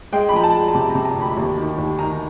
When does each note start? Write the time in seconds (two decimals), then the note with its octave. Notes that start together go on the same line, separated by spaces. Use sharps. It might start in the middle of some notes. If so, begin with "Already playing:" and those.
0.12 G#3 G5
0.29 B5
0.33 F3 A#5
0.43 A5
0.54 G#3
0.68 A5
0.75 C3 A#5
0.90 A#5
0.95 C3
1.05 A#5
1.16 D2 B5
1.37 D#2
1.57 D#3
1.78 D#2
1.99 D#3 A#5